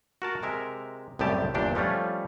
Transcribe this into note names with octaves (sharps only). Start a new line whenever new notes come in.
F#4 A#4 A5
C3 G#3 A#4 E5
C2 F#2 A2 C#3 G4 A5
G1 E2 A#2 D4 G4 G5
F3 G3 A3 C#4 F4